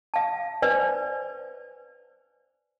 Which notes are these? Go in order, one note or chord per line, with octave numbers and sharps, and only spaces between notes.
F5 A5
B4 C5 D5 G#5